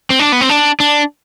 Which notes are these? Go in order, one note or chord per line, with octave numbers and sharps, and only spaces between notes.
C4
D4
B3
C4
D4
D4